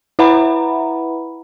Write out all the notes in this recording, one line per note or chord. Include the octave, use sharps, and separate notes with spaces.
E4 B4 E5 F#5 A#5 B5